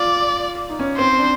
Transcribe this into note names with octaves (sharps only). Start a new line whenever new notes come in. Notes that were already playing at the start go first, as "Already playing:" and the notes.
Already playing: F4 D5
D#4
C#4
C4 C5
D4